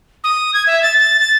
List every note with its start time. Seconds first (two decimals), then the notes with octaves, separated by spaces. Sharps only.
0.24 D#6
0.54 G#6
0.67 E5
0.83 A6
0.99 A6
1.20 A6